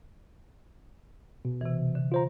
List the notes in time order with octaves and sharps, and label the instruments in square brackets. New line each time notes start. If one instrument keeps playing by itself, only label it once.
[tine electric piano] B2
[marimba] C3 E3
D3
[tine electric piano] F4 C5 A#5